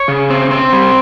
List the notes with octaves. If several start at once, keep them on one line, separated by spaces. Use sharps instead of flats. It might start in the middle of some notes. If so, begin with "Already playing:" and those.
Already playing: C#5
C#3
C4
C4
G3